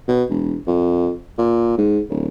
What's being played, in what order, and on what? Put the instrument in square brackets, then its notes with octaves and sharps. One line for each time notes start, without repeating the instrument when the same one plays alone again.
[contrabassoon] B2
E1
F2
A#2
G#2
D1